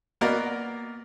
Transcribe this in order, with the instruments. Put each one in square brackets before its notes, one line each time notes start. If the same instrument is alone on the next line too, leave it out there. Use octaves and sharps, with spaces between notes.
[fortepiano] A#3 B3 F#4 A#4 D5 D#5